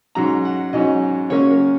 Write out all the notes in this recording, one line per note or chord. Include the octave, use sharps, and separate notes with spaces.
G#2 F#3 C#4 A#5
F#5
G#2 F#3 C#4 D#5
C#3 F#3 A#3 C#4 C#5
A#4